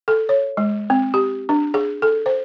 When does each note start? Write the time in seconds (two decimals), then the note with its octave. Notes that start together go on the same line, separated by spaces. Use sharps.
0.08 A4
0.29 C#5
0.57 G#3
0.90 C4
1.14 G4
1.49 D4
1.74 G#4
2.02 A4
2.26 C5